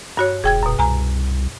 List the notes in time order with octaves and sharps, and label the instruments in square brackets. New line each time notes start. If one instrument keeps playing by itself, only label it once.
[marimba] G2 F#4 C#5
[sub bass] E1 [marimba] G#4 G5 G#6
[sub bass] D#1 [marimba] F#2 B2
[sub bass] C2 [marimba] G#5 A#5